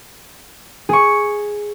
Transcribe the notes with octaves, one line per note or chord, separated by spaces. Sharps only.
G#4 C#6